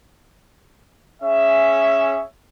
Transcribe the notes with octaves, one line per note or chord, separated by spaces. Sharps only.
C#4 G#4 E5